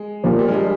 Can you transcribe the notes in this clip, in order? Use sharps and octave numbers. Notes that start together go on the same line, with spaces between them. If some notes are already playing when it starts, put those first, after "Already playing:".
Already playing: G#3
A#2 F3 G3 A#3 D4
G3
G#3
G3